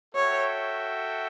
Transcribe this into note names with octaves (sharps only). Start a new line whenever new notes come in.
F#4 A4 C#5 E5 G5